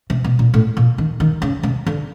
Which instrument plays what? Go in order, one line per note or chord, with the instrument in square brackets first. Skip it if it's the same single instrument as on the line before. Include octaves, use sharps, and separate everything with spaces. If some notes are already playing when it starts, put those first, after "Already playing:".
[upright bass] C3
B2
A#2
A2
A#2
D#3
D#3
C#3
C3
D3